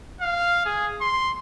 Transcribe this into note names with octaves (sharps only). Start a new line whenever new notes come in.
F5
G#4
C6